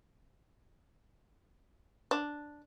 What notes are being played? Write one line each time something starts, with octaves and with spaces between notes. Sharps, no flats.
D4